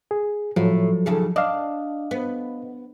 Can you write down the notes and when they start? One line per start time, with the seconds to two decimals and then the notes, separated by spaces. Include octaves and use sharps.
0.11 G#4
0.56 A2 F3 F#3
1.06 D#2 C#3 A4
1.36 D4 D#5 F5
2.11 B3